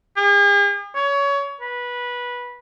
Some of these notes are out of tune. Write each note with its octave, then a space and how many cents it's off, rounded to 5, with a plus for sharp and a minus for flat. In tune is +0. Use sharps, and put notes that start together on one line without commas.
G#4 -45
C#5 +25
B4 -15